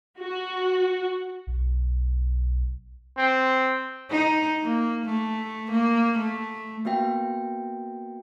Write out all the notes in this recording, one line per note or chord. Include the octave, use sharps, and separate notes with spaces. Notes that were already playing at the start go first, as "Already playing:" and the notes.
F#4
B1
C4
D#4
A#3
A3
A#3
A3
A#3 B3 F#4 E5 G5